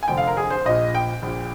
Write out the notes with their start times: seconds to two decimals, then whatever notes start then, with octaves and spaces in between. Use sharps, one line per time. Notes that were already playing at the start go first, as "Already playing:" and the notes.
0.03 G#5
0.08 F1 F2 D3 G5
0.17 F5
0.27 A#4
0.37 G#4
0.50 C5
0.65 A#1 A#2 D#5
0.95 G5
1.22 A#1 A#2